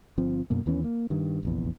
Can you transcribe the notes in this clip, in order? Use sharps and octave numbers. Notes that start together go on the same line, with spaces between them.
G1 F3 C4
F#2 B2 A#3
D#2 E3 B3 C#4
A#3
G2 D#3
F1 A#1 E2